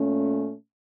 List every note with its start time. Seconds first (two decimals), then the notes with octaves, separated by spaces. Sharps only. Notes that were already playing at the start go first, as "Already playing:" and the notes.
Already playing: A#2 A3 C#4